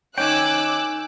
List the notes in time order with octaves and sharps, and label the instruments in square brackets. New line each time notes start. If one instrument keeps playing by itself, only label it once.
[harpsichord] D#3 C#4 [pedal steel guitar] G5 G#5 [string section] D6 E6 F#6